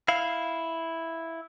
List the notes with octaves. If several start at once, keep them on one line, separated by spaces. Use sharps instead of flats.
E4 F5